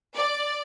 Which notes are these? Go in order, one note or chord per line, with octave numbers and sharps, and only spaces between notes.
D5